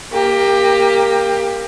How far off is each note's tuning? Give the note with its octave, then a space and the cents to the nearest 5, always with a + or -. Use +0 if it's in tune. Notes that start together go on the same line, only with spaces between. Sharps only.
A#3 +0 G4 +20